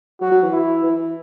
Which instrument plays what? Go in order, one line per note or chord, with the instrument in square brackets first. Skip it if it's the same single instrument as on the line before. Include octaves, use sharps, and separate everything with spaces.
[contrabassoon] F#3 [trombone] F#4
[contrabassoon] F#3
E3
[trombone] E4
[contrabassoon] E3